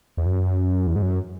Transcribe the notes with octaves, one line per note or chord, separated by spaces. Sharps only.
E2
F#2
E2
G#2
F#2